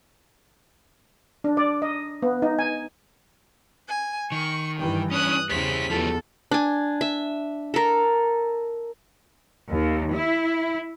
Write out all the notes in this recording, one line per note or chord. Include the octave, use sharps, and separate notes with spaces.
D4
D5
D#5
B3
D#4
G#5
G#5
D#3 C#6
G2 E3 G5
C#4 D4 D#6 F#6
E2 C#3 G3 C5 B6
E2 F3 G3 A4
D4 G#5
E5
A4 A#4
D#2
E4